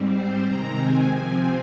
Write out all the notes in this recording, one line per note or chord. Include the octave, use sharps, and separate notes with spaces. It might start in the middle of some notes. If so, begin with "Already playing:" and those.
Already playing: G#2 G3 C4
C5
C3 D#3 G#3 C4 A#5
G#5
C3 F3 C4